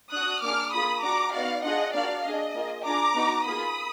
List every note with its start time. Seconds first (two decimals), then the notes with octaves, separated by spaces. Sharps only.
0.12 D4 F#4 D#6 F#6
0.42 A#3 D4 G#4 D6 F6
0.72 A#3 F4 G#4 B5 D#6
1.03 D4 F#4 A#5 D6
1.33 B3 D#4 F#4 D5 F5
1.64 D4 F4 G#4 D#5 F#5
1.94 A#3 D4 F#4 D5 F5
2.25 D4 G#4 D#5
2.55 A#3 F4 G#4
2.85 D4 F4 G#4 A#5 D6
3.15 B3 D#4 F#4
3.45 A#3 F4 G#4 B5 D#6